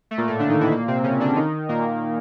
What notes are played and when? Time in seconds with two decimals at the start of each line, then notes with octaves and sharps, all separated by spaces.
0.11 A3
0.18 A#2 A#3
0.28 A2 A3
0.39 D3 D4
0.50 D#3 D#4
0.60 E3 E4
0.72 A#2 A#3
0.87 C3 C4
1.04 C#3 C#4
1.20 D3 D4
1.36 D#3 D#4
1.69 A#2 A#3